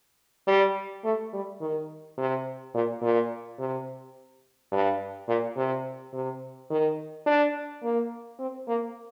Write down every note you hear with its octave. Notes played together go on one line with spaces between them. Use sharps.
G3
A3
G3
D#3
C3
A#2
A#2
C3
G2
A#2
C3
C3
D#3
D4
A#3
C4
A#3